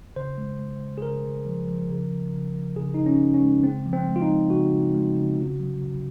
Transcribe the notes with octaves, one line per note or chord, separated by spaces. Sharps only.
C#3 C5
G#3
G#3
C#3
G#4
C#3 A#4
C#3
F3
F3
C#3
C#3
C#3
F3
C#3 G#4
C#3 D#4
C#4
C#3
C#4
G#3
C#3 C4
F3
C4
G#3
F4
D#4
G#3
C#3 F#4
C#3
G#3
C#3
C3
F#3
C3